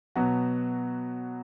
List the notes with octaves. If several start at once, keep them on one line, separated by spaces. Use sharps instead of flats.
B2 F#3 B3 F#4